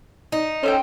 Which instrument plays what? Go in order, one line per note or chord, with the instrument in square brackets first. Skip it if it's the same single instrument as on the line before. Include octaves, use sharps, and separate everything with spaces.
[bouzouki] D#4
[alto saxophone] C#4 [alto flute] A4 [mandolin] C5 E5 G5